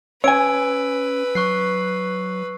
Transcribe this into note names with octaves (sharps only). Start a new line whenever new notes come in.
C#4 B4 C#5 G#5 E6 D7
F#3 C#6 F#6 C7